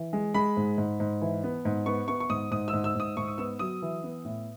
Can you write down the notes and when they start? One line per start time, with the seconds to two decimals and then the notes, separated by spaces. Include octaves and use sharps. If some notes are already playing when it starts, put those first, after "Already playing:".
Already playing: E3
0.13 G#3
0.34 G#3 B5
0.57 G#2
0.78 G#2
1.00 G#2
1.22 E3
1.44 B3
1.65 G#2
1.86 B3 C#6
2.08 B3 C#6
2.20 C#6
2.30 G#2 D#6
2.51 G#2 D#6
2.68 E6
2.73 G#2
2.84 E6
2.95 G#2 D#6
3.17 G#2 C#6
3.28 D#6
3.38 B3 E6
3.59 F#3 D#6
3.82 E3
4.03 B3
4.25 A2